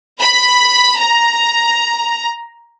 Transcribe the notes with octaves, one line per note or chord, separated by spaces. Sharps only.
B5
A#5